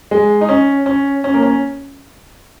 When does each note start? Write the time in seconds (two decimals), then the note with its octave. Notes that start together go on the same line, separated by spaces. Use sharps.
0.11 G#3
0.41 D#4
0.49 C#4
0.86 C#4
1.24 C#4
1.34 A#3
1.43 C#4